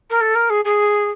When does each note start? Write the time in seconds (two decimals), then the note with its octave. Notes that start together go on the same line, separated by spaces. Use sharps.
0.10 A#4
0.21 A4
0.35 A#4
0.50 G#4
0.65 G#4